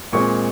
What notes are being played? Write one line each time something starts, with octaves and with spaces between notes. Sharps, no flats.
A#2 G#3 C4 C#6